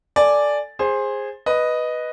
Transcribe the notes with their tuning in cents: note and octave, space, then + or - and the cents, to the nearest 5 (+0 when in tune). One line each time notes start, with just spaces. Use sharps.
A4 +0 D5 +0 G#5 +0
G#4 -10 C5 +15
B4 +0 D#5 +0